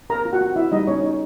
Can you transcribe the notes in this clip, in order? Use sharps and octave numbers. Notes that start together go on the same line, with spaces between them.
C4 A#4 A#5
F4
F#4 F#5
C4
E4 F#4 E5
G3 D#4 D#5
B3 C#4 C#5
D#4